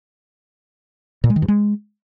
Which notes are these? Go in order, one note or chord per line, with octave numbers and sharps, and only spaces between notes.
A#2
G#3
D#3
G2
G#3